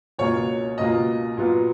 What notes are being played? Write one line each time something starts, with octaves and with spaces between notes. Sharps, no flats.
C#2 B2 A#3 F4 C#5
C#2 B2 A#3 F4 D#5
A#2 F#3 B3 F4